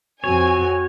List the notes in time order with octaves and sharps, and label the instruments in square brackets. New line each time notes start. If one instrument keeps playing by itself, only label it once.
[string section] F2 C4 G#5 [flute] F#4 [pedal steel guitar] C#5